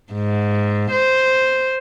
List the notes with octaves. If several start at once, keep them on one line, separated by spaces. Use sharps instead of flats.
G#2
C5